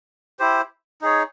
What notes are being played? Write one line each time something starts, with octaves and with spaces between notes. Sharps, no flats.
E4 G4 C5
D#4 G#4 C#5